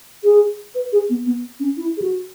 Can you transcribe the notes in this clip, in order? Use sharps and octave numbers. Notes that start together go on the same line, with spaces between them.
G#4
B4
G#4
B3
B3
C#4
E4
G#4
F#4